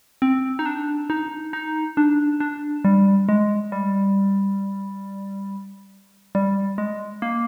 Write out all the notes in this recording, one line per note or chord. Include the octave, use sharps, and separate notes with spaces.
C4
D#4
D4
D#4
D#4
D4
D4
G3
G#3
G3
G3
G#3
A#3